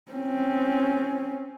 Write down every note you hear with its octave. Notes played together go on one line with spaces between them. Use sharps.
C4 C#4